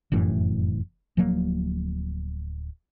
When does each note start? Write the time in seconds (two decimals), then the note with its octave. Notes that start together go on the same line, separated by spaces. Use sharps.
0.12 F1 F#2 A2 E3
1.17 D1 F3 F#3 A#3